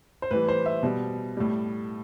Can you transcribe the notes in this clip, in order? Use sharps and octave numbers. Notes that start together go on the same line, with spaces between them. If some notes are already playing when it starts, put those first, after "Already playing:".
C5
A2 E3 G3 B4
C5
E5
B2 G3
A2 G3